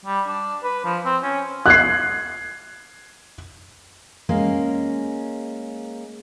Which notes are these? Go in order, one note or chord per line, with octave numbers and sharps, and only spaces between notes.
G3
D4
B4
F3
C4
C#4
F#6 G#6 C7
G#3 A#3 C#4